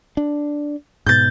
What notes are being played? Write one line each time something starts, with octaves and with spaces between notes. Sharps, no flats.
D4
G#2 B2 G6 A6